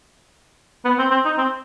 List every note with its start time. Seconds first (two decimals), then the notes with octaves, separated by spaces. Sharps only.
0.85 B3
0.98 C4
1.11 C4
1.25 D#4
1.38 C4